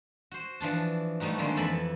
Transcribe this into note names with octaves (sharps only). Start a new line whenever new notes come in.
F#4 C5
E3 F3 D4 A5
F3 G3 A3 D#4 F#4
D3 D#3 G#3 A#3 C4
F2 E3 A4 D5 E5 B5